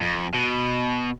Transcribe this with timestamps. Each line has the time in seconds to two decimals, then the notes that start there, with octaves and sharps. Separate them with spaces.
0.02 F2
0.34 B2